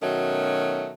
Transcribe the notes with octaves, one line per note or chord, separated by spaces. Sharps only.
B2 D#3 F#3 A3 C#4